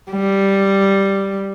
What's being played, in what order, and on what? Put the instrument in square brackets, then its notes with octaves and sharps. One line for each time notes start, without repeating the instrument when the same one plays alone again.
[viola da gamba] G3